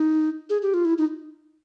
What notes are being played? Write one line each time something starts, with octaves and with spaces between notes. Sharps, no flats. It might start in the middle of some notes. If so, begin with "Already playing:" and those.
Already playing: D#4
G#4
G4
F4
E4
D#4